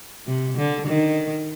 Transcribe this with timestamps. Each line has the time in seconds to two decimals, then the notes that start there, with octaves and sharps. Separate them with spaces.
0.27 C3
0.57 D3
0.87 D#3